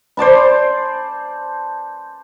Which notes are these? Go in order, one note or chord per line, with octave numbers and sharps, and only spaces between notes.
C5 D5 A5 B5